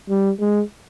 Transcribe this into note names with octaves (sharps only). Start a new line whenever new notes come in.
G3
G#3